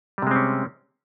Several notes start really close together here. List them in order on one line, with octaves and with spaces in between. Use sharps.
G3 C3 G#3 C4 C#4